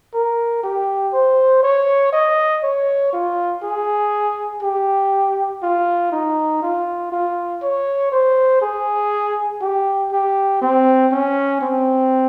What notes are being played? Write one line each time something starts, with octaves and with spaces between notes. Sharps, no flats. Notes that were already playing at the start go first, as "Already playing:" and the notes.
A#4
G4
C5
C#5
D#5
C#5
F4
G#4
G4
F4
D#4
F4
F4
C#5
C5
G#4
G4
G4
C4
C#4
C4